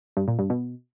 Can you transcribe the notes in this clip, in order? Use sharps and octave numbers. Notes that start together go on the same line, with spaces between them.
G2
A#2
G2
B2